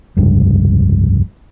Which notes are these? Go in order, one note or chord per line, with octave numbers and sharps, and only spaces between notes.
F1 C#2 G2